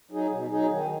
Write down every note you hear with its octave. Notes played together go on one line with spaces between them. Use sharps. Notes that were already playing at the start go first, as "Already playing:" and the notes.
F#3 D#4 G#4
B2
F#3 D#4 G#4
D#3